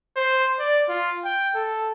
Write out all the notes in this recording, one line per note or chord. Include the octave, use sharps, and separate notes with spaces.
C5
D5
F4
G5
A4